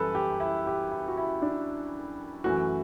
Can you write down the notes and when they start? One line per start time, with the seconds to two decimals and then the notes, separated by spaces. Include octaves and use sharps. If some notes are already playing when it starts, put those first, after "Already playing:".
Already playing: F#2 E3 G3 A4 B4
0.15 G4
0.40 E4
0.67 G4
0.91 E4
1.08 F#4
1.17 E4
1.42 D4
2.44 F#2 E3 A3 F#4